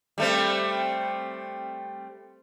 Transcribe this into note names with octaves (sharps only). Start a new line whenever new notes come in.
G3 A3 C4